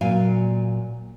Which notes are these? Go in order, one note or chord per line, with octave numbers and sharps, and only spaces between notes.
A#2 F#3 F5 G#5